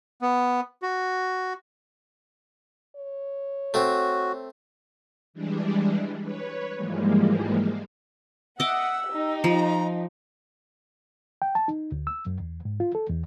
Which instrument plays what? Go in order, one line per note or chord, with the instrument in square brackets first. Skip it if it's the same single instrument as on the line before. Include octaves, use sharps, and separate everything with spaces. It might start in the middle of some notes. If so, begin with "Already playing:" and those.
[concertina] B3
F#4
[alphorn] C#5
[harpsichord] A3 C4 [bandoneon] F#4
[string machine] E3 G3 G#3 D4
B4 C#5
G#2 E3 F3 G3 G#3 A#3
[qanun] D#5 D6 [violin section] E5 F#5 [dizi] E6
[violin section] D#4 G4
[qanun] F3 [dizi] A#5
[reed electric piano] G5
A5
D#4
D2
E6
F#2
E2
G#2
F4
A4
E2